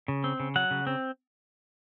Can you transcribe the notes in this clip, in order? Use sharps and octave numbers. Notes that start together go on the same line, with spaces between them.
C#3
C4
C#3
F#3 F#5
C#3
C4